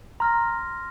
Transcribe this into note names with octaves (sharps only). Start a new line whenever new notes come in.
A#5 C6 F6 A#6